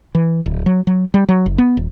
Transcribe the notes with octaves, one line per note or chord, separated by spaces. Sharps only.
E3
D1
F#3
F#3
G3
F#3
F#1
B3
D#1